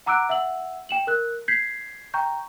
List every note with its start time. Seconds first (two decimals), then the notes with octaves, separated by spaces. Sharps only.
0.06 F#5 A#5 D6 E6 F#6 D7
0.29 E5 F#5 E6 F#7
0.89 G5 E7 F#7
1.07 A#4 F#6
1.48 G6 G#6 B6 C7
2.14 G5 A#5 C#6 G6